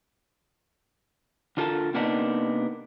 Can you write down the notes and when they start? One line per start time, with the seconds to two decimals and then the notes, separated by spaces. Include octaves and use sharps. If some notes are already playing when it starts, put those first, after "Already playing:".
1.57 D3 D4 F4 A4 A#4 A5
1.94 C3 A#3 B3 D4 D#4